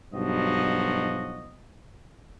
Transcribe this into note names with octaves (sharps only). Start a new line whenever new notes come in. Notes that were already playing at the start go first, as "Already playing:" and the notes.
B1 G2 F3 F#4 D#5